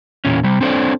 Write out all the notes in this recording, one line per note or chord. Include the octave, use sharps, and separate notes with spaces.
E2 A#2 C#4
C3 G3
C4 D4 A4 A#4 C5 D5